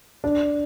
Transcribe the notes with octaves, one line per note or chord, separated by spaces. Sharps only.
D4